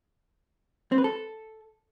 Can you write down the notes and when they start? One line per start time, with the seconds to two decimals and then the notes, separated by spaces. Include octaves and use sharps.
0.92 C4
0.98 B4
1.04 A4